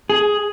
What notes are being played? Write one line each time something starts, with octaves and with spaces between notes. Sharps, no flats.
G#4